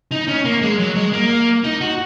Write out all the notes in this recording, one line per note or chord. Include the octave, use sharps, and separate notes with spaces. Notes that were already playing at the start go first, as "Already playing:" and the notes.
D#4
C#4
A#3
G#3
F#3
G#3
A#3
D#4
F#4